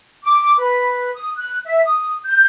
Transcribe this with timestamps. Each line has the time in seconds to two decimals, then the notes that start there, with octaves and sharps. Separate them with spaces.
0.24 D6
0.59 B4
1.15 D#6
1.37 F#6
1.65 E5
1.84 D#6
2.25 G6